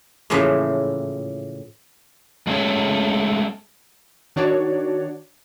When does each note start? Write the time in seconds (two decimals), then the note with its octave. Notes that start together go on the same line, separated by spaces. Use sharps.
0.30 A2 C#3 E3 F3 A#3
2.47 G#3 A3 C#4 G#4 C#5
4.36 D#3 D4 F#4 C#5 D5